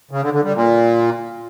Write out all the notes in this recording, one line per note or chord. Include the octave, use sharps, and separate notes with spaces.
C#3
D3
D3
G3
A#2